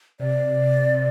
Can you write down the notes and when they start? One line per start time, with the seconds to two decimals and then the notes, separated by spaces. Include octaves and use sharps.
0.20 C3 D5
0.94 C3